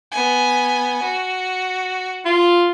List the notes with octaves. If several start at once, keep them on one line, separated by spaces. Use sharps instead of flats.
B3 G#5
F#4
F4